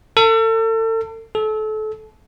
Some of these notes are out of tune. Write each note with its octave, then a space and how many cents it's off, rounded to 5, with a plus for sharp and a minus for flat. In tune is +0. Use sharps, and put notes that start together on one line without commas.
A4 +35
A4 -30